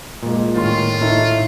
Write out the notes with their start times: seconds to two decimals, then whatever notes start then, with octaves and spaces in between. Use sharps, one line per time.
0.23 A#2 G#3
0.56 A2 D#3 F4 C6
1.01 A2 D#4 E4 A4 E5